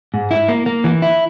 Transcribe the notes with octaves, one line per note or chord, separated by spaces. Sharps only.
G#2
E4
A#3
A#3
E3
E4